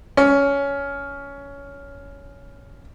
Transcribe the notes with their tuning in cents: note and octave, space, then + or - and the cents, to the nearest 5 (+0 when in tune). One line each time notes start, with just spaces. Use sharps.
C#4 +15